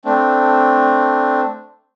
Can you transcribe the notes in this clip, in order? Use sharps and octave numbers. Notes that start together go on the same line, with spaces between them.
A3 C4 D4